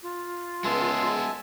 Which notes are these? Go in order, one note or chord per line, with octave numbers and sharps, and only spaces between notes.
F4
C#2 G#3 B3 E5 G#5 A5 C6